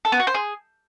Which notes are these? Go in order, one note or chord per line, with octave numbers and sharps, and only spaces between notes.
A4
B3
F#4
C5
G#4